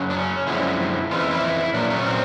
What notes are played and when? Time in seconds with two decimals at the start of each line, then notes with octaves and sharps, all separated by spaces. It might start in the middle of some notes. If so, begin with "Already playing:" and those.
Already playing: F#2 C#3 F#3
0.10 D4
0.15 C#4
0.47 F#2 D3 F3 G#3 C4 E4
1.11 F2 C#3 E3 F4
1.21 E4
1.31 E4
1.73 A#2 F#3 A#3 D4
1.91 C#4
2.06 C4